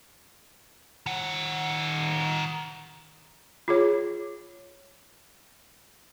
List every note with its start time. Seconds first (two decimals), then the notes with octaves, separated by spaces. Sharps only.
1.06 D#3 F#5
3.68 F4 G#4 C#5